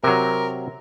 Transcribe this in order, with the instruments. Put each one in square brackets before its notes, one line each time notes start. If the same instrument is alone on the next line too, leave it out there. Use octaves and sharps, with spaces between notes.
[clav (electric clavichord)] C3 F#3 [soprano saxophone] A#4